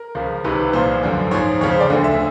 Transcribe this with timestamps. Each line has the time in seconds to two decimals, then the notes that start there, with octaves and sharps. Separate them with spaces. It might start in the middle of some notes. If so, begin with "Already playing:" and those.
Already playing: A#4
0.15 C#2 C#3 F3
0.44 C2 C3 D#3 B4
0.59 B4
0.73 C2 A#2 F3 C5
1.03 F#2 D3 F3
1.31 G#2 F3 C#5
1.61 F2 C#3 F3 C#5
1.71 C5
1.80 D5
1.90 D2 D3 F3
2.04 E5